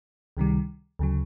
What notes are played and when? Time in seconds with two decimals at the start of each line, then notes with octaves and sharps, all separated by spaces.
0.37 C#2 C3 D#3 G3
0.99 D2 C#3 F#3